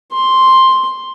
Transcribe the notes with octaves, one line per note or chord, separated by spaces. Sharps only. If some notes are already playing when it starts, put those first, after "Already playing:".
C6